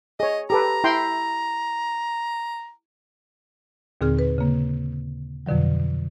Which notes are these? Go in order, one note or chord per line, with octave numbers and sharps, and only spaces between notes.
G#4 C#5 D#5
G4 A4 B4 A#5
E4 G5 C6
D#2 A#2 D3 C4 G#4 F6
B4
C#3 A#3
F2 B2 D3 F3 F#3